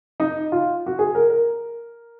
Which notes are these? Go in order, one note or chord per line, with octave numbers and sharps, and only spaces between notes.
D#4
F4
F#4
G#4
A#4
A#4